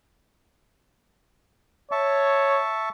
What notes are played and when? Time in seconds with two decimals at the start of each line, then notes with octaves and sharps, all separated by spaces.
1.92 C#5 E5 A5 C#6